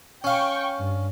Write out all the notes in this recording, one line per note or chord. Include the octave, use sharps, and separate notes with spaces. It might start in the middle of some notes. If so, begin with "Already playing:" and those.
C#4 F5 G5 C#6
G2